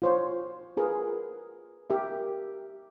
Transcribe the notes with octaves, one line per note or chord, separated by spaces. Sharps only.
F4 C5 C#5
F4 G#4 A#4 B4
G4 A#4 E5